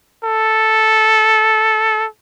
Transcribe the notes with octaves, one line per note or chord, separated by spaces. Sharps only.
A4